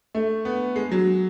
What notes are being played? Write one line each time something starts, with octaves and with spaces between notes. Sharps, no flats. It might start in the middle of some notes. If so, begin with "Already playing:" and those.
A3
B3
G#3
F#3